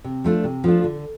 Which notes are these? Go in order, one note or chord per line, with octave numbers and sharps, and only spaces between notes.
C3
F3 A3 D4 F4
C3
F3 A3 D4 F4
D3